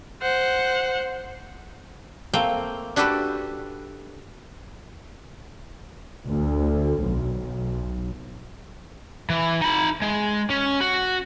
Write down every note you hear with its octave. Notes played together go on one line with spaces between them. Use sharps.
C5 F#5
A3 A#3 C4 G5
D4 F#4 G4 A4 B4
D2
B1
E3
D#4 B5
G#3
C#4
F#4